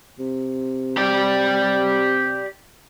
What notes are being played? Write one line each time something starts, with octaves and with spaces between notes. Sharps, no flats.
C3
G4 D5